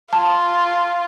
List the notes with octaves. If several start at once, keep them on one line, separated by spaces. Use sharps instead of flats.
F4 A5